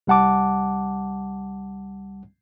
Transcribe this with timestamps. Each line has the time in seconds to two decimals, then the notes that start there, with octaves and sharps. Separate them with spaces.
0.07 C2 G3 F#5 A5 D6